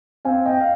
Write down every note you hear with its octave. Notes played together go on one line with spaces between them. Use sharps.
C4 F5 G#5
D#5 G5
F5